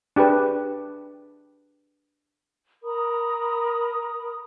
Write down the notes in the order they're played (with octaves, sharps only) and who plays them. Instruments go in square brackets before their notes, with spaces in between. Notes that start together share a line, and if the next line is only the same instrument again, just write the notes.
[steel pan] D4 G4 G#4 B4
[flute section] A#4 A#5 B5 D#6